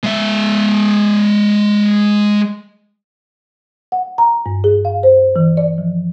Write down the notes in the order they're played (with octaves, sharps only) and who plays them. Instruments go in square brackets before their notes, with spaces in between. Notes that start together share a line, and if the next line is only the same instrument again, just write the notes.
[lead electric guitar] G#3 E5
[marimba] F#5
A#5
G2
G#4
F5
C5
E3
D5
F3